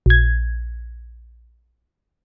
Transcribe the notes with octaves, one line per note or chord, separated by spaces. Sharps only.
A#1 G#6